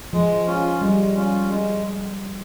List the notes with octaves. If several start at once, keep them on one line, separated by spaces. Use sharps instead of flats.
F3 G#3
C#4 F4
G3 G#3
C#4 F4
G#3